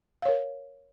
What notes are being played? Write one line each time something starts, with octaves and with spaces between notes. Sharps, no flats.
A#4 C#5 F5